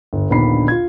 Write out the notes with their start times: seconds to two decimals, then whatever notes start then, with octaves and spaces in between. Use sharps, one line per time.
0.13 G1
0.30 A#1 D#2 D3 B3 B5 C7
0.68 F4 G#6